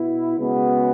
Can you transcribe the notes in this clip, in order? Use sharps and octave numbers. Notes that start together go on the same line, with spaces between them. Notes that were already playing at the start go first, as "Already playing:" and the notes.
Already playing: B2 B3 E4
C#3 G#3 B3 F#4